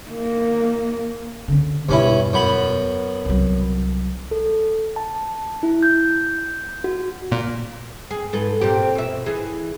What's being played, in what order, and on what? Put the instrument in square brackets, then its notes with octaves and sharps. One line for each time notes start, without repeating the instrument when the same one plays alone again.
[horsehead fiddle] A#3
[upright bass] D3 C#4
[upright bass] E2 B2 [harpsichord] G2 C#4 E4
[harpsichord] F#2 B3 B5
[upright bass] C2 F#3
[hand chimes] A4
A5
E4
G6
F#4
[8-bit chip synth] A#2
[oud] G#4
G#2 A4 B4
A#2 C4 G4
B2 E5
E3 G#4